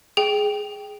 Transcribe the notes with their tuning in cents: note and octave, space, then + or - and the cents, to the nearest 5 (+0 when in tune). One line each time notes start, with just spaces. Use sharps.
G#4 +5 G5 +0